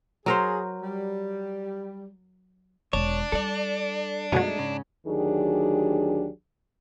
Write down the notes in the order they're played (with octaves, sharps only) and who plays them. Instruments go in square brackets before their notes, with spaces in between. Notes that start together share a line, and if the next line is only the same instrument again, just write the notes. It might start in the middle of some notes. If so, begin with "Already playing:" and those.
[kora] F#3 A#4 C5 [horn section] G#4
[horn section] G3
[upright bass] E1 [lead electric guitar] D4 [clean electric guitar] C#5
[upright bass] G3 [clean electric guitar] A4 D5
[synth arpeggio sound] F#2 B2 F#3 [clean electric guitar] G#3 A3 D#4
[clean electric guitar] G#2 C#3 C#4
[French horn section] D2 D#3 F#3 D4 G4 G#4